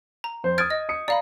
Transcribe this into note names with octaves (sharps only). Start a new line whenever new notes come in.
A#5
F2 C5
D#6 F6 G#6 A6 D7
D#5
D#6 C#7
D5 F5 A#5 B5